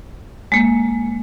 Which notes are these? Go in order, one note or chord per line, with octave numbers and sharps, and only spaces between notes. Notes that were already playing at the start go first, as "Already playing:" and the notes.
G#3 A#3